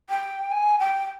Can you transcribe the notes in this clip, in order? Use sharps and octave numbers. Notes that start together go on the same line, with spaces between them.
G5
G#5
G5